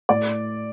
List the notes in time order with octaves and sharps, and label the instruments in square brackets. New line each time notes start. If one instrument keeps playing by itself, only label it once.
[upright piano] A2 D5